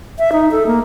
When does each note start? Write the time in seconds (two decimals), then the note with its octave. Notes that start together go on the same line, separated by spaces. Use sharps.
0.19 E5
0.33 D#4
0.51 A4
0.67 A#3